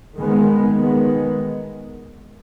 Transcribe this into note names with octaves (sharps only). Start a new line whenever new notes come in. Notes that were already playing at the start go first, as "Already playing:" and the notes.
D#3 G#3 B3
D#3 G#3 B3